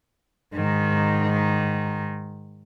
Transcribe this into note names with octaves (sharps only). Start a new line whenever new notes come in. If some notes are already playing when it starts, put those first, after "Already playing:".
G#2 D#3